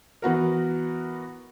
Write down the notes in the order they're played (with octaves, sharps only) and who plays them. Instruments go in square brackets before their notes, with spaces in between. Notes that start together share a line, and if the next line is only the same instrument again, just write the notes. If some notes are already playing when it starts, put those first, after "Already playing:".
[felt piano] E3 B3 F#4 A#4